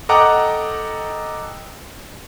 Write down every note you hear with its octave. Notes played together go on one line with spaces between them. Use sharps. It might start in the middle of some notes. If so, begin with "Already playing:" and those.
A4 D#5 F#5 G5 A#5 D6